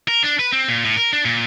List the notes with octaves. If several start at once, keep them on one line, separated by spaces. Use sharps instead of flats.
A#4
D4
B4
C4
A#2
A2
A#4
D4
A#2